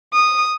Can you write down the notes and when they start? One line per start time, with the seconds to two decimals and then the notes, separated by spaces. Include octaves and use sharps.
0.14 D#6